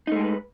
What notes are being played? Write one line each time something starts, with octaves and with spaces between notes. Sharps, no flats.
G#3 A3 D#4 G4 B4